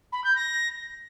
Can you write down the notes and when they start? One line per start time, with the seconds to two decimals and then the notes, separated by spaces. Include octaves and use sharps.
0.12 B5
0.24 G6
0.35 A#6